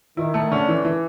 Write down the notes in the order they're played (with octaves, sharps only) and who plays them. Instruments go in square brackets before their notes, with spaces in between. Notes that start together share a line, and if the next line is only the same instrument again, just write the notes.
[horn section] D#3 [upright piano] E4
[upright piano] A3
[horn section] D3 [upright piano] C#4
[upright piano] E3
E3